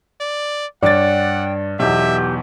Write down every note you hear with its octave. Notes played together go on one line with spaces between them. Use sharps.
D5
G2 C#5 D5 F#5 G5 A6
B1 E2 G4 E5